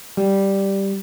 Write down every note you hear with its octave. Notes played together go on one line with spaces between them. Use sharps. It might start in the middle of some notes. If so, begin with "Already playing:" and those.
G3